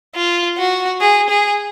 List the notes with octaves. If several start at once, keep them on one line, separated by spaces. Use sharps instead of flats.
F4
F#4
G#4
G#4